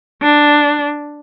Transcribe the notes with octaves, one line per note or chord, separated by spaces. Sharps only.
D4